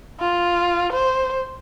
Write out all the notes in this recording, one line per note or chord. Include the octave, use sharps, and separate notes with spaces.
F4
C5